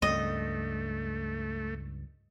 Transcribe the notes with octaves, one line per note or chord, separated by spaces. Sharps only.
C#2 G2 A3 D#5